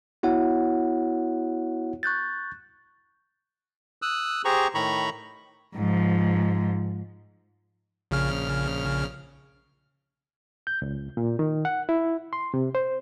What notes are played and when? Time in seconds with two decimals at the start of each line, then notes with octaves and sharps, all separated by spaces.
0.23 B3 E4 F#4 C#5 F#5
2.03 C#6 F#6 G6 A6
4.02 D#6 E6 F#6
4.45 G4 G#4 C5 A#5 C#6
4.75 A2 D#3 A#5 B5 C#6
5.75 G#2 F3
8.11 A#1 C#3 F6
10.67 G6
10.82 C#2
11.17 A#2
11.39 D#3
11.65 F#5
11.89 E4
12.33 C6
12.54 C3
12.75 C5